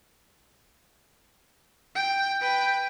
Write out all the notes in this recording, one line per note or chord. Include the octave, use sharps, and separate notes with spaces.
G5
B4 G5